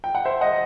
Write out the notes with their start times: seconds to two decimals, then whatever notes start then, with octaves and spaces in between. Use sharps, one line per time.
0.04 G5
0.15 F#5
0.25 C5 E5
0.41 D#5 F#5